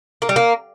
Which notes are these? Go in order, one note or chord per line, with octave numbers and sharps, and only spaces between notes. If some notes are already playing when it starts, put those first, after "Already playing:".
A#3
G3
A#3